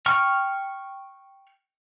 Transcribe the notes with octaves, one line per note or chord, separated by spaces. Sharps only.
G5 C#6 F6